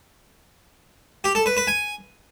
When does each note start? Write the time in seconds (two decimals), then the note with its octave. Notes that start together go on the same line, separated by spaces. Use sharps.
1.24 G4
1.35 A4
1.46 B4
1.57 B4
1.67 G#5